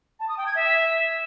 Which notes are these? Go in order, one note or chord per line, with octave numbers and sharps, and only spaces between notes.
A5
D#6
G5
G#6
E5